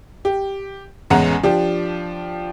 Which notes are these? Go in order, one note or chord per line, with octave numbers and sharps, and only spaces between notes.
G4
A1 E2 G#3 C#4 F#5 A#5
F3 D4 G4